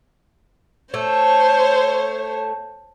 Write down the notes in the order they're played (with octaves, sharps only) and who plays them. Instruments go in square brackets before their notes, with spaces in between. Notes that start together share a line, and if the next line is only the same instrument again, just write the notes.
[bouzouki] A3 [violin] C5 C#5